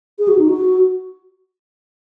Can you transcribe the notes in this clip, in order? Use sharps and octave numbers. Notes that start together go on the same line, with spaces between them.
G#4
F#4
D#4
F#4